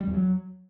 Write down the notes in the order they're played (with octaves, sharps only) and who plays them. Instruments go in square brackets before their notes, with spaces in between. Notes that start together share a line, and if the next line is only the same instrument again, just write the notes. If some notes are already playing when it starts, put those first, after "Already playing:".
[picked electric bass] G3
E2
F#3